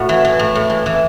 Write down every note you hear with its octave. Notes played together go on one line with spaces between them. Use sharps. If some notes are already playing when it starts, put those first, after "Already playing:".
Already playing: A2 F#4
E3
E3
A2
A2
E3
E3